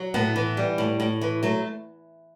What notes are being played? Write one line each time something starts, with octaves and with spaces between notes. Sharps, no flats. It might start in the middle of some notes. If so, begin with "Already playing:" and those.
Already playing: F#3
A2 B3
E3
G3
A2
A2
E3
F#3 A3